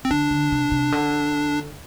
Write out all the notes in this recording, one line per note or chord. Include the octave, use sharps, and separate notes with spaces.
C4
D3 D4
D3
C3
C3
D3